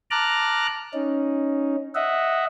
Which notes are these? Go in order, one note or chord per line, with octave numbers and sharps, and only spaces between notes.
A5 A#5 D6 F6 F#6
C#4 D#4
D#5 E5 F#5